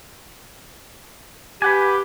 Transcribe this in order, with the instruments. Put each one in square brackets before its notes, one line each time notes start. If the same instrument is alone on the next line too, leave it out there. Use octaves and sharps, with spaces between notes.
[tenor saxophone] G4 [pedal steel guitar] B4 F#5 G#5